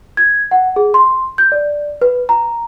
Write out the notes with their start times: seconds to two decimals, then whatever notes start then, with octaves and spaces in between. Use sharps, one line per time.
0.17 G#6
0.51 F#5
0.76 G#4
0.94 C6
1.38 G6
1.52 D5
2.02 B4
2.29 A#5